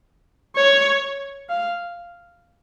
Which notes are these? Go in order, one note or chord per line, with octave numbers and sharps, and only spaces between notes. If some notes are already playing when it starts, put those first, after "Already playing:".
C#5
F5